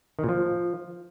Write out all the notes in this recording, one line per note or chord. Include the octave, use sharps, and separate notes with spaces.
D#3
A#2
F3